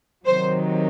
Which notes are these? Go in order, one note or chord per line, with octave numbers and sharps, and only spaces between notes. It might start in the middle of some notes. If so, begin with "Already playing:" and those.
C3 D#3 F#3 C5